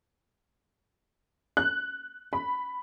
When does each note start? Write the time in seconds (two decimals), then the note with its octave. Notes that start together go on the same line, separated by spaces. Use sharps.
1.57 F#6
2.33 B5